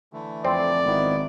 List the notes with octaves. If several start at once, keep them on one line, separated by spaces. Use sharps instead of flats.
D3 E3 A3
F2 C4 D5
G#1 D#3 B3 E4